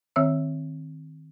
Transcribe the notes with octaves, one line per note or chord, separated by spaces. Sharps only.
D#3 C4 C#5 E5 E6